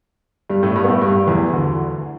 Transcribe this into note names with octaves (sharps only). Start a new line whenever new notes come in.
G2 G3
A2 A3
G2 G3
B3
A2 A3
G2 G3
E2 E3
D2 D3